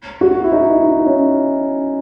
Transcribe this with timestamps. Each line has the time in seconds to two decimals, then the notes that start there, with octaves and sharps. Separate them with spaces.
0.21 F#4
0.44 E4
0.52 D#4
0.82 D#4
1.06 C#4